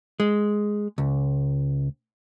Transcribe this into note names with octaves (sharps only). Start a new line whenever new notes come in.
G#3
C#2